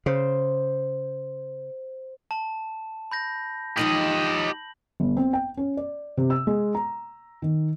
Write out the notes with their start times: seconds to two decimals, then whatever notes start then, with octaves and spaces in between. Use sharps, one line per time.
0.06 C#3 C5
2.31 A5
3.12 B5 G6 A#6
3.77 D#3 F3 G#3 G4 D#5 F#7
5.00 G1
5.17 C4
5.33 G5
5.57 C#4
5.77 D5
6.17 C3
6.30 E6
6.47 G#3
6.75 A#5
7.42 D#3